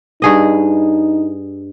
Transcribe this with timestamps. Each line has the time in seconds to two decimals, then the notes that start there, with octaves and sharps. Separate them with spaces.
0.22 G2 D#4 G#4 D#5